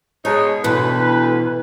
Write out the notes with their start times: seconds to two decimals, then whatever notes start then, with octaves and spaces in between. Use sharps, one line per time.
0.25 B2 G#3 D#4 C#5
0.64 D2 B2 E3 B4